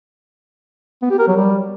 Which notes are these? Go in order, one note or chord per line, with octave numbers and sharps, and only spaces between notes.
B3
G4
A#4
F#3
G3